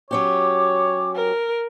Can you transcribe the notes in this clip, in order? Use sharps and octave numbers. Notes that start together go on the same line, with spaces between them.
F#3 C#4 G4 C#5 D6
A#4